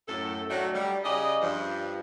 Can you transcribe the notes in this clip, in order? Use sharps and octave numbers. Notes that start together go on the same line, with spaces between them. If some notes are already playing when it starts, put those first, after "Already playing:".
F#2 A2 A4
D#3 F#3 A3 D4 F#4 C#5
G3
C#3 G#4 D5 D#5
G2 F3